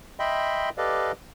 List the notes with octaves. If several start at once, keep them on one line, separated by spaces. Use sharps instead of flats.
D#5 E5 G5 B5 C6
G4 A4 B4 D5 D#5 F5